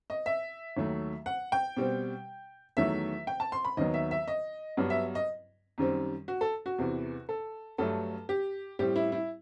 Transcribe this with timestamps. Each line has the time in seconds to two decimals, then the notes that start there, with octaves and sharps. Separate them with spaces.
0.10 D#5
0.26 E5
0.77 D#2 D#3 F#3 A3
1.26 F#5
1.52 G5
1.77 B2 G3 C4
2.77 E2 D#3 F#3 A3 E5
3.27 G5
3.40 A5
3.52 C6
3.65 B5
3.77 D#2 D#3 F#3 B3 D#5
3.94 E5
4.11 E5
4.28 D#5
4.77 G2 F#3 B3
4.90 E5
5.15 D#5
5.78 F#2 D#3 G3 C4
6.28 F#4
6.41 A4
6.66 F#4
6.78 E2 C3 E3
7.29 A4
7.78 G2 F#3 A3 A4
8.29 G4
8.79 A2 G3 C4 G4
8.96 E4
9.12 E4